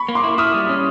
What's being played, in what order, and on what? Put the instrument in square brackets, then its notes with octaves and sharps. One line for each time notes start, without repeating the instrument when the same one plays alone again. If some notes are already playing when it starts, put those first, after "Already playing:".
Already playing: [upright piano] B5 C#6
[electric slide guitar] A#3
[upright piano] C6 D6
[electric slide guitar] E4
[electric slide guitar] E4 [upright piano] D#6 F6
[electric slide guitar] G3
C#4